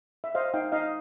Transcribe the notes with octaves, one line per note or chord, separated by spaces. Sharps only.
E5
C5 D#5 F5
D#4 F5 G5
D#4 D#5 F5